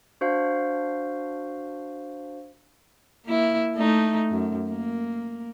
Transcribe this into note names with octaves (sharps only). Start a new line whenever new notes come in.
D4 F#4 C5 F5
A#3 E4
A3 D#4
F#2
A#3